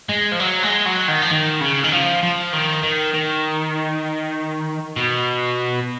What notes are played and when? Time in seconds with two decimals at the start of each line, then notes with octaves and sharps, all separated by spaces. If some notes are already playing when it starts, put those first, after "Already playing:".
0.09 G#3
0.32 F3
0.40 F#3
0.63 G#3
0.85 F#3
1.08 D#3
1.22 F3
1.31 D#3
1.61 C#3
1.84 D#3
1.92 F3
2.23 F3
2.53 D#3
2.83 D#3
3.14 D#3
4.97 B2